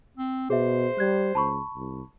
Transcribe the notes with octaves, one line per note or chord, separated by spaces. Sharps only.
C4
B2 G#4 C5 E5
G3 F#6 G#6
C#2 A5 B5 C#6
C2